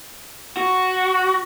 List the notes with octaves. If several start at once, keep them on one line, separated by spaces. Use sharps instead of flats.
F#4